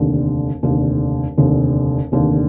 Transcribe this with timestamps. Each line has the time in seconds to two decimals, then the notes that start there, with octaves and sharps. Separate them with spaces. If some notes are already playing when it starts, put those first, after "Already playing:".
Already playing: F1 D#2 D3
0.63 F1 D#2 D3
1.38 F1 D#2 D3
2.12 F1 D#2 D3